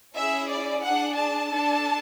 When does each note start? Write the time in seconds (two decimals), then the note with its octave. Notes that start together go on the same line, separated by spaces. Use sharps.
0.16 C#4 E4 G#4 E5
0.50 D5
0.83 D4 G#4 F#5
1.17 A5
1.51 D4 A4